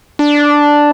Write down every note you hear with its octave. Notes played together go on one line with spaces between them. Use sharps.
D4